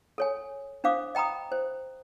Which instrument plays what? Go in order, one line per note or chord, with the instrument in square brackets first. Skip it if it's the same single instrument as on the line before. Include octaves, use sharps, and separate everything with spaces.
[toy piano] A4 C#5 G#5
D4 C5 F5 D6 D#6
D#5 G5 A#5 B5 D#6
C5